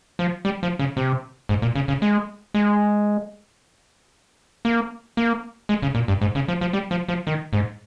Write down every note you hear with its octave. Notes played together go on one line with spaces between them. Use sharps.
F3
G3
F3
C#3
C3
G#2
A#2
C#3
C#3
G#3
G#3
A#3
A#3
G#3
C#3
A#2
G2
G#2
C#3
F3
F3
G3
F3
F3
D#3
G#2